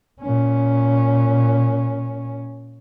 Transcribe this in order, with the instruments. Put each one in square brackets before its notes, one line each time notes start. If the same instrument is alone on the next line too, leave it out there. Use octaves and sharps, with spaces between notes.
[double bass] A#2 C#4